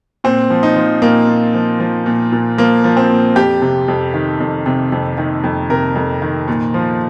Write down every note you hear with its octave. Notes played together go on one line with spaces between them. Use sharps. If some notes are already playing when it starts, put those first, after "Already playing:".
A#2 C4
F3
D#4
F3
A#2 A#3
A#2
F3
F3
A#2
A#2
F3 A#3
F3
C4
A#2
F2 G4
C3
F2
D#3
F2
C3
F2
D#3
F2
C3 A#4
F2
D#3
A#2
F3